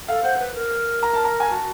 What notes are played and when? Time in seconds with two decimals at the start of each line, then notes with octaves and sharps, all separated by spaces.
0.08 A4 F5
0.23 C5 F#5
0.39 B4
0.55 A#4
1.03 A#5
1.13 A5
1.24 A#5
1.40 G#5
1.50 F#4 A5